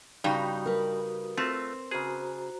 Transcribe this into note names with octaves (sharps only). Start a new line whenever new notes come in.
G2 C#3 G3 D#4 F#4 D#6
A#4 B4
A3 C4 F4
C#3 F#4 G#4 C5 A#5